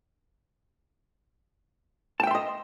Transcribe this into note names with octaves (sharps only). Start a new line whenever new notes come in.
D#5 E5 G5 A5 C6